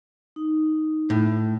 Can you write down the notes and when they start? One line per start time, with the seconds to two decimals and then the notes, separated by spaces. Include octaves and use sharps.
0.36 D#4
1.10 A2